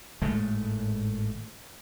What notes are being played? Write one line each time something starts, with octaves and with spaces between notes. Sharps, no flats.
G#1 A2 G#3 A3